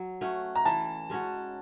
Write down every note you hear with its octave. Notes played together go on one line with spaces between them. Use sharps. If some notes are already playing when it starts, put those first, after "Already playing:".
Already playing: F#3
A3 C#4 F#4
A#5
E3 A5
G#3 C#4 F#4